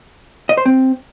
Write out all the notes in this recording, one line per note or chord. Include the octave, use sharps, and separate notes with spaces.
D#5
C5
C4